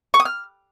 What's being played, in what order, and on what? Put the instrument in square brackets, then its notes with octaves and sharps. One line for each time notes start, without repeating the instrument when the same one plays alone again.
[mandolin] C#6
D#6
F6